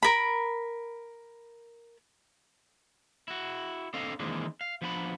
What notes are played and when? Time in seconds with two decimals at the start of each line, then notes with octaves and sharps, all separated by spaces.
0.03 A#4 B5
3.28 E4 F#4
3.94 C4 D4 A4 D#5 F5
4.20 D#3 E3 G#3 A#3 C4 D4
4.61 F5
4.82 F3 B3 D4 G#5 B5